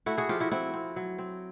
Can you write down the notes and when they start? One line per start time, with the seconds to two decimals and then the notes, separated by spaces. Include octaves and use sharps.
0.06 A3 E4 F#4
0.18 F#4 G#4
0.29 F3 F4 G4
0.40 E4 F#4
0.52 C4 E4 F#4
0.74 C4
0.96 F#3
1.18 C4